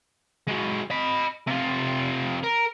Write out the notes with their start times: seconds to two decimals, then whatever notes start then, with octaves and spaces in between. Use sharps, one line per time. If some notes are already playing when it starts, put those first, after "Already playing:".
0.47 G#3 F#4
0.91 D#5 B5
1.47 C3 F4
2.44 A#4